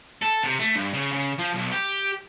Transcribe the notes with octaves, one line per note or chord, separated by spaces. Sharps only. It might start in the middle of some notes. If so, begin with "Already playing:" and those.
A4
C3
A3
G2
C#3
C#3
F3
B1
G4